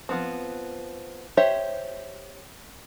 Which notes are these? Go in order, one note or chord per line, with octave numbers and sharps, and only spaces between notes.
F3 B3 C4
G4 C5 C#5 E5